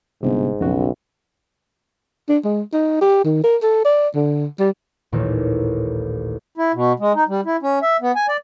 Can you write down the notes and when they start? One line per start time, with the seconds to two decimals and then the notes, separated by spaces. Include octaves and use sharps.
0.23 G1 G#2 C3
0.61 B1 F2 C#3 F#4
2.29 D4
2.44 G#3
2.72 D#4
3.01 G4
3.25 D#3
3.44 A#4
3.62 A4
3.85 D5
4.14 D3
4.60 G3
5.12 A1 D#2 A#2 D#3 E3
6.58 E4
6.74 B2
7.00 G#3
7.15 D#4
7.28 G3
7.45 E4
7.62 C#4
7.82 E5
8.01 B3
8.16 G#5
8.28 D5